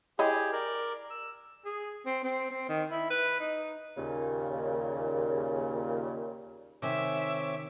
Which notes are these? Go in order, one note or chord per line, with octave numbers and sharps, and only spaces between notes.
E4 G4 G#4 C#5 D#5
A#4 D5
E6
G#4
C4
C4
C4
D#3
E4
B4
D#4
D#2 A#2 C#3
C3 D#3 C4 C#5 E5 G#5 D6